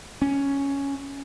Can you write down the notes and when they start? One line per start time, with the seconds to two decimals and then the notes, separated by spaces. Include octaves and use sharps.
0.22 C#4